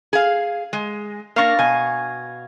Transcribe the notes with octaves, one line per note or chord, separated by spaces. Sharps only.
G#4 F5
G#3
A#3 D4 F5 C#6 A#6
B2 G#5